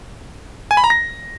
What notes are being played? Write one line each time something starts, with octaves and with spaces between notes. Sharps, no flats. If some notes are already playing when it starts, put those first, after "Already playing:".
G#5
B5
A#5
A#6